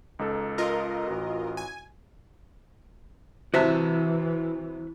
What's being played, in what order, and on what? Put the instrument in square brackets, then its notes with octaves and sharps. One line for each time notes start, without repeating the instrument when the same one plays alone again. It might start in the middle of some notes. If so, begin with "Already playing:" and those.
[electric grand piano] C#2 D#4 A4
[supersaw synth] F4 A#4 D#5
[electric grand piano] A1 F#4
[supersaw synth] G#5
[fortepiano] C2 C3 A5 [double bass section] E3 [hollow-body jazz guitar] F#4 C5 E5